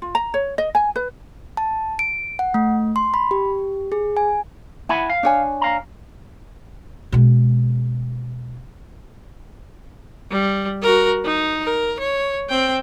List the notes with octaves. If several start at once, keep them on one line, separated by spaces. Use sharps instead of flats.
F4
A#5
C#5
D#5
G#5
B4
A5
D7
F#5
A3
C6
B5
G4
G#4
G#5
E4 F#5 G#5 B5
F5
D4 C#5 G#5
F5 A#5
B2 G#3
G3
F#4 A#4
D#4
A#4
C#5
C4 G5